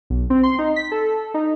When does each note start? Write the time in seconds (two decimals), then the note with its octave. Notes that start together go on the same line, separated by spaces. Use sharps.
0.10 B1
0.30 C4
0.43 C6
0.59 D#4
0.76 B6
0.92 A4
1.34 D#4